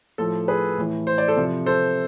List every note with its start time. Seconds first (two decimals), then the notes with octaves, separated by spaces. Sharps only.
0.18 A2 F3 A4
0.48 G#4 B4
0.78 A2 E3
1.07 C5
1.18 D5
1.28 A4 C5
1.36 C3 F3
1.66 A4 C5